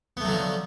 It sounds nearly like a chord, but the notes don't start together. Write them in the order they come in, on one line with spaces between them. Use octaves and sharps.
B3 A3 F#3 D3 F3